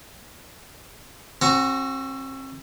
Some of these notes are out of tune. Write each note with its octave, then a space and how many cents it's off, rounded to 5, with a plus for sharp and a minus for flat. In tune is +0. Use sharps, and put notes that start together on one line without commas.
C4 +40 F#4 +0 A#5 -20